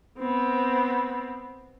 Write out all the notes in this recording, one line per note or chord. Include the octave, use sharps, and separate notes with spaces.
B3 C4